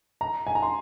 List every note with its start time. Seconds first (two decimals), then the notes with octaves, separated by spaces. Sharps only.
0.21 A#5
0.47 G#5
0.55 A#5
0.62 C6